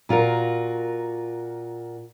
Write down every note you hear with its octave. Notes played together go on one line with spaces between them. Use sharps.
A#2 F4 F#4 A#4